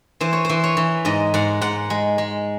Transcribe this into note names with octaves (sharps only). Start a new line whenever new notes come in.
E3 C5
C#5
E3 C5
C#5
E3
G#2 D#5
G#2 F#5
G#2 F#5
G#3
G#3